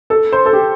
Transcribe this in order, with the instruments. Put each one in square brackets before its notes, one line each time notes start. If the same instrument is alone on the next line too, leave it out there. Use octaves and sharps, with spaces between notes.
[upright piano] A4
C5
A4
G4